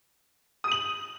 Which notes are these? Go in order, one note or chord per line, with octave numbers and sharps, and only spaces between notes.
D#6 D#7 F#7